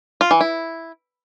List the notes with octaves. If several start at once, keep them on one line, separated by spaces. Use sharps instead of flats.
F4
E3
E4